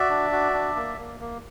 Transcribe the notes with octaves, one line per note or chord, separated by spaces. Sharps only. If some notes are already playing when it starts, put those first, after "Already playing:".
Already playing: F#4 D5 E5
D4
F#4
D4
A#3
A#3
A#3